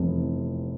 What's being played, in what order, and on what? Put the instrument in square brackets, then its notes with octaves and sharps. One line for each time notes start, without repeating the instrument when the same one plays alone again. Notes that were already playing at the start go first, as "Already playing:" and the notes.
Already playing: [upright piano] F1 E2 C3 F3